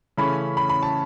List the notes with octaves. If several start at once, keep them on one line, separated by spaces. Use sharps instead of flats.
C#3 E3 A3 C#4 B5
B5
B5
A5